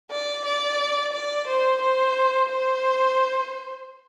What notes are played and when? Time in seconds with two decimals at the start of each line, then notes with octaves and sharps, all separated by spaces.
0.11 D5
0.45 D5
1.12 D5
1.47 C5
1.81 C5
2.49 C5